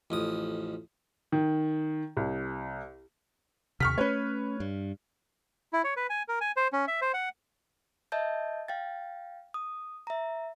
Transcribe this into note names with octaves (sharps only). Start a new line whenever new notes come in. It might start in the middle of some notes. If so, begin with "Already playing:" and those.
A1 F2 D#6
D#3
C2
D#2 C3 C#6 F6 B6
A3 C#4 B4 C#5
G2
E4
C#5
B4
G#5
A#4
G#5
C5
C#4
E5
C5
F#5
D#5 E5 A5 G6
F5 G5 A6
D#6
E5 A#5